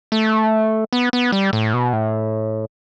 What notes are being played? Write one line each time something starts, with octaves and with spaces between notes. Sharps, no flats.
A3
B3
B3
G3
A2
B2
A2